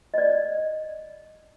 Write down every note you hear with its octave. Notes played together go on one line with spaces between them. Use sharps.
D5 D#5